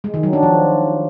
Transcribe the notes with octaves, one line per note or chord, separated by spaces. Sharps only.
G#3
D#3
F#3
D4
F3